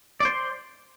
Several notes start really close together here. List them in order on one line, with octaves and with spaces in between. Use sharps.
D5 C5 C6